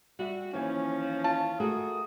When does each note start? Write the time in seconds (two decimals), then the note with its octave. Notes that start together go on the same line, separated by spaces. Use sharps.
0.19 G3 F#4 E5
0.54 D#2 E3 F3 C#4 G#5
1.24 F4 A5
1.60 A3 F#4 G#4 A#4 D#6